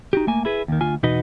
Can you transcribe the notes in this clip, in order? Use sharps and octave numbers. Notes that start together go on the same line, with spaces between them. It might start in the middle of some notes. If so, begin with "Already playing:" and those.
D#4 F#4 G4
A3 A#3 G#5
E4 G#4 B4
D#2 D#3
D2 F4 G#5
E2 B2 D#4 F#4 B4 D#5